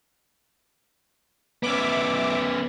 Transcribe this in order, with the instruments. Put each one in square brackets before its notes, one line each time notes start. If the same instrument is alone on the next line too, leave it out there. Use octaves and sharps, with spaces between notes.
[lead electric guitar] B3 C#4 [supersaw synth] E5 D6